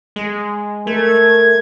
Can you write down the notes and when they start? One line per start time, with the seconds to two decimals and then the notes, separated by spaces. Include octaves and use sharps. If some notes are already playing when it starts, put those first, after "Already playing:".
0.16 G#3
0.87 A3 A#4 G#6